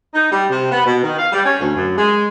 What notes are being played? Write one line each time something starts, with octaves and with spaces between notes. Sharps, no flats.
D#4
G3
C3
B3
B2
D#3
F5
G3
C#4
D2
F#2
G#3